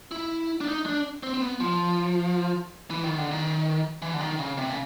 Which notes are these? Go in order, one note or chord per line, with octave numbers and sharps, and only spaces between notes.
E4
D4
D#4
D4
C4
C4
B3
F3
E3
D#3
D3
D#3
E3
D3
D#3
C#3
C3
C#3